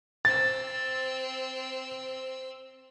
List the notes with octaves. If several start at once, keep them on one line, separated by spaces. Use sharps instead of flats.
C4 E6 A6